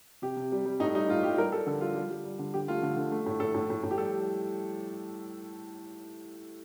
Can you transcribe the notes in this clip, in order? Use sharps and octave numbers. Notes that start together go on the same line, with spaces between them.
C3 G4
C3
G3
G3
A2 D#4
G3 D#4
A2 F4
G3 G4
G3 A#4
G3 A4
D3 A4
G3 F4
G3
G3
G3
D3
D3 G4
A3 F4
D3
D3
A3
A2
A2 A4
A2
A2
A2
G4
G3 A4